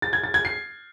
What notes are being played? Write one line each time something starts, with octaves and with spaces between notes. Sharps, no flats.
A6
G#6
A6
G#6
C7